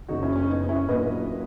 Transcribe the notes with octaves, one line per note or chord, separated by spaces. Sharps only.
F#1 F#2 C#3 D#4 F#4
C#4 E4
C#4
B3 D#4
C#4 E4
A#1 A#2 F#3 B4 D#5